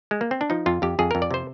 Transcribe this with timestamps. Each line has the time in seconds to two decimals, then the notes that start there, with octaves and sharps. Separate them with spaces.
0.11 G#3
0.21 A#3
0.31 C4
0.41 D4
0.50 F3 D#4
0.66 F2 F4
0.82 F2 G4
0.99 F2 G#4
1.11 F2 A#4
1.22 D5
1.31 C3 C5